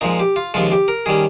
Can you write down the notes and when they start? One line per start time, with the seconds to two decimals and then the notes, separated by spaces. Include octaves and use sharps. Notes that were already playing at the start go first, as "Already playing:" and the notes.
0.01 A#2 F3 G#3 D#4
0.20 G4
0.36 F4
0.54 D#2 C#3 F3 G#3 F4
0.72 G4
0.88 A#4
1.06 D#3 G3 C#4 G#4